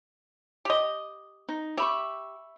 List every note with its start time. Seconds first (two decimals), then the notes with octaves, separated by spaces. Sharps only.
0.65 G4 D#5
1.49 D#4
1.77 G4 E5 B5 C#6